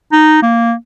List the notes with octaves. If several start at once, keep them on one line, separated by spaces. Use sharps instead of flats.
D#4
A#3